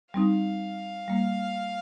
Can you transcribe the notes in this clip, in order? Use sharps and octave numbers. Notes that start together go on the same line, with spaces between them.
G3 C4 D#4 F5
G3 A#3